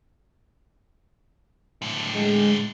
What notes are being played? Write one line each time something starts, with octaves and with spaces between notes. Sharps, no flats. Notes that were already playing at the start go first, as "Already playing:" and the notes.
A2 D3
G#3